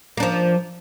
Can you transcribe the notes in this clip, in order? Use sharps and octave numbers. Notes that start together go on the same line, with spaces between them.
F3 A#3 D4